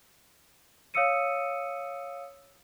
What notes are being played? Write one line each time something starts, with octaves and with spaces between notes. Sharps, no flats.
C#5 F5 D#6 E6 C#7 D#7